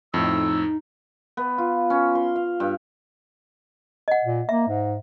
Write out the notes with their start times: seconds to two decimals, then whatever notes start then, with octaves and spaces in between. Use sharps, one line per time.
0.14 F2 A2 D#4 E6
1.37 B3
1.58 F4
1.90 C#4
2.15 C6
2.36 F5
2.60 G2
4.08 D#5 F#5
4.24 A#2
4.49 A#3 E5
4.68 G#2